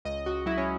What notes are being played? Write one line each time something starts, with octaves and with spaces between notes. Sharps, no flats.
C#2 D#5
C#2 F#4
F#3 E4
C#4